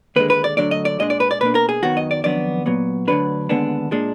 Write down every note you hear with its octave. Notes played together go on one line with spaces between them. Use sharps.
D#2 D3 G#3 B4
B4
D5
D2 D3 F#3 D4 D5
D#5
D5
A#2 G#3 D4 D#5
D5
B4
D5
B2 A#3 D4 B4
A#4
G#4
F#2 D#3 F#3 B3 F#4
D#5
D5
F2 D#3 F#3 B3 D4 D5
A#2 F#3 B3
D2 D3 F#3 D4 B4
D#2 D3 G#3 B3 D4
A#2 G#3 D4